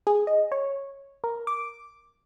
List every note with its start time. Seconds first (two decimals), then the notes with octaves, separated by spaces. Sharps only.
0.07 G#4
0.27 D#5
0.52 C#5
1.24 A#4
1.47 D6